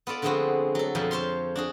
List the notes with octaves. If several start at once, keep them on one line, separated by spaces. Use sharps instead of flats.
B3 F4 A4 D5
D3 F3 G#3 B3 C4 F#4
F#3 A4
F2 B2 F3
C5 C#5 F5 C6
D4 F#4 G#4